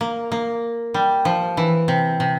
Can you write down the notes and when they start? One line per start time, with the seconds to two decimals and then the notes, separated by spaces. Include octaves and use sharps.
0.01 A#3
0.32 A#3
0.94 G3
1.25 F3
1.57 E3
1.88 C3
2.20 C3